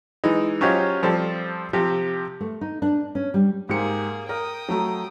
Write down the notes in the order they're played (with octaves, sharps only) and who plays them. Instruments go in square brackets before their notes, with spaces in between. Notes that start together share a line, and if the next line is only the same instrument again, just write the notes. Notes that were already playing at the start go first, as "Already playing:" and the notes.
[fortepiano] E3 G#3 D#4
F#3 C#4 F4 G4 C5 D#5
F3 G3 C4 A4
C3 F3 G4
[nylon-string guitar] A3
D#4
D4
C#4
G3
[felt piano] G#2 G4 C#7 [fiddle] A#3 G#4
[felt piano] A#4 [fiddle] G5 D#6
[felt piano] F#3 A3 A#5